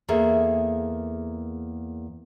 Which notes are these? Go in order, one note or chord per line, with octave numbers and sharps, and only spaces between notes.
E2 A#3 G#4 A4 E5